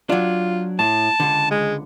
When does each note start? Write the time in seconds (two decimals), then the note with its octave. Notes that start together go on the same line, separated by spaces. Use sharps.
0.09 F#3 D4 F4
0.79 A2 A5
1.20 C#2 D3
1.51 G#3